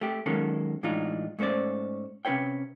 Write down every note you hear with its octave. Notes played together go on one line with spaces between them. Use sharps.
A3 G4
D#3 F#3 G#3 A#3 C#4 A4
A2 E3 G#3 D4 D#4 F4
G#2 A3 C#4 C5 D5
C3 C#4 F4 B4 C#5 G5